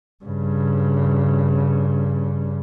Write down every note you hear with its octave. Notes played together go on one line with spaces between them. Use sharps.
G2 C#3